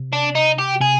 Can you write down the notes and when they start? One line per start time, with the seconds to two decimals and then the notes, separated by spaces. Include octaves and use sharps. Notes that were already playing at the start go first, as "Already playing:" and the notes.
Already playing: C3
0.13 D4
0.35 D#4
0.58 G4
0.81 C3 G#4